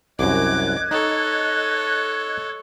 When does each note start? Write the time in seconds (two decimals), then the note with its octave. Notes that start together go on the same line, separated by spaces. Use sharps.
0.19 C2 F#2 D#5 D6 F#6 G#6
0.91 D#4 A4 C#5